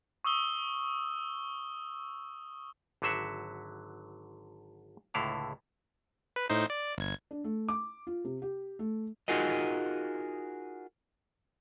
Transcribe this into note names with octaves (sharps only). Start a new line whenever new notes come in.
C#6 D#6 E6 G7
G#1 D3 F#3 C5 E5 F#5
C#2 A2 D3 E4 F5
B4
A2 D#4 C5
D5
G1 G#6
D4
A3
D6
F4
C3
G4
A3
D#4 F4 F#4 G#4 A#4 D#5